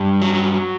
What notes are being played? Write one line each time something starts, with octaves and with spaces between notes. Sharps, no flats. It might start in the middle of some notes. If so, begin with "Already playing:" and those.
Already playing: G2
F#3